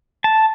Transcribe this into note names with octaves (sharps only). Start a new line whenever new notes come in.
A5